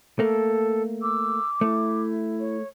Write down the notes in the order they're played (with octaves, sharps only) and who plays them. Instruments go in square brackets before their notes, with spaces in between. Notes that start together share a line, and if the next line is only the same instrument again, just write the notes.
[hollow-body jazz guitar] A3 A#3 [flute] A4
[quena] D6 [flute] E6
[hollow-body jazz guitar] A3 [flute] E4
[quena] C#5